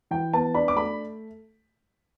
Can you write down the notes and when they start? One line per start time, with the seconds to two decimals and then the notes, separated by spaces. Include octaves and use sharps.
0.11 E3 G5
0.33 B3 A5
0.54 D4 B5
0.68 D6
0.76 A3 B5